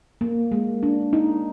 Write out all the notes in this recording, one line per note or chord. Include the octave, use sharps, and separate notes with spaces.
A#3
G#3
D4
D#4